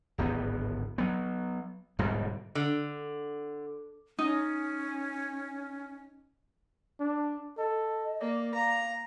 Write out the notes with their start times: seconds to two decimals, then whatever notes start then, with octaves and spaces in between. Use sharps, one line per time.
0.18 D1 G#1 B3
0.98 F#3 B3
1.99 D1 G#2 B2 G3
2.55 D3
4.19 C#4 D#4
7.00 D4
7.58 A4 D#5
8.21 A#3 D5
8.54 F5 A#5